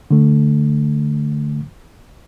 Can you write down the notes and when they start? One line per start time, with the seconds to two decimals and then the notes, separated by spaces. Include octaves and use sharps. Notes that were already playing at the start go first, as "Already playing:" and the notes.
0.11 D3 A3